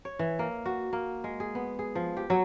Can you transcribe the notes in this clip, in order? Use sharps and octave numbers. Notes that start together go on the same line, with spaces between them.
C#5
E3
A#3
F#4
A#3
G#3
G#4
B3
G#4
F3
G4
F#3